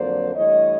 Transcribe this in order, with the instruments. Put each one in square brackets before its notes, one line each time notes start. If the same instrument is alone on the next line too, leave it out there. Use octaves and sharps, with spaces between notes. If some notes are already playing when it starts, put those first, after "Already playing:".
Already playing: [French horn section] F2 D3 F#3 A#3 C5 D5
G2 E3 A3 C#5 D#5